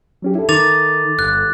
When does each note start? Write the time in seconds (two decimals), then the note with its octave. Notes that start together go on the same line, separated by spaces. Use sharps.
0.22 F#3 C#4 G4
0.35 E4 A4
0.49 D#3 D6 A6 F7
1.19 G1 F#6